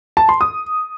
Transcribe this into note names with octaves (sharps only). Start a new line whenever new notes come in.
A5
C6
D#6